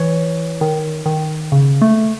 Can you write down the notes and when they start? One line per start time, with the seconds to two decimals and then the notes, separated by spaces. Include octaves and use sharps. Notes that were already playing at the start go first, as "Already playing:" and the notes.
Already playing: E3 C#5
0.61 D#3
1.06 D#3
1.52 C#3
1.82 A3